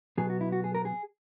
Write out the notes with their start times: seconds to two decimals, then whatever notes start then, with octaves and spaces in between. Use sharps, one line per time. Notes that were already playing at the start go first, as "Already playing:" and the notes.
0.18 B2 F#3 B3 G#4
0.30 F#4
0.41 E4
0.52 F#4
0.64 G#4
0.75 A#4
0.85 G#4